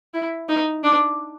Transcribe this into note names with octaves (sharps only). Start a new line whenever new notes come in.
E4
D#4
D4